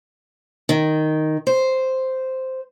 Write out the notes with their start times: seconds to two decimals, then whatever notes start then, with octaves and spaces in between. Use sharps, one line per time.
0.69 D#3
1.47 C5